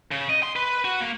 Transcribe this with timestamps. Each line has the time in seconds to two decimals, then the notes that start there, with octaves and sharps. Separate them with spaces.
0.11 C#3
0.30 D#5
0.43 C6
0.56 B4
0.85 F#4
1.00 A#3